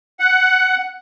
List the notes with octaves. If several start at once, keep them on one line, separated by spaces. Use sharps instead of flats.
F#5